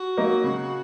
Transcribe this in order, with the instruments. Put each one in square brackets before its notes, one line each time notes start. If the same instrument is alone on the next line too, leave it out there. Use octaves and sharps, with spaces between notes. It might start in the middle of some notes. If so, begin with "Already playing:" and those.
Already playing: [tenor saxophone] F#4
[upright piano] F#3 A#3 D#4
C#3